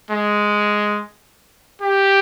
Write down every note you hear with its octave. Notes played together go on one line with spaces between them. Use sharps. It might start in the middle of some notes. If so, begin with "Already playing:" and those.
G#3
G4